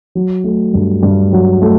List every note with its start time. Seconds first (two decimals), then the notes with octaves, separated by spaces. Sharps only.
0.15 F#3
0.44 A3
0.74 G2
1.03 G2
1.33 F#3
1.61 A3